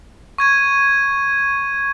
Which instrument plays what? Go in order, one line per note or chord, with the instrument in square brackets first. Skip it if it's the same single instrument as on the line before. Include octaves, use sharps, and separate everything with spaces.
[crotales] C#6 G#6 D#7